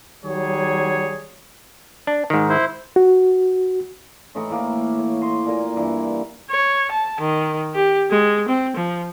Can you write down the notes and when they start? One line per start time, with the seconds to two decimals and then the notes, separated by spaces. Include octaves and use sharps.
0.24 D#3 F#3 G3 G#4 C#5
2.07 D4
2.30 G#2 D#3
2.49 E4 C5
2.96 F#4
4.35 A2 E3 D#4 C#6
4.50 A2 E3 A#3
4.99 C#5
5.21 D#5 C6
5.46 A#2 A#4 G#5
5.76 G2 E3 E4
6.50 C#5
6.91 A5
7.20 D#3
7.75 G4
8.11 G#3
8.48 C4
8.77 F3